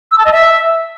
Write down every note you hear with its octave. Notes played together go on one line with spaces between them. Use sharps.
E6
A5
D#5
E5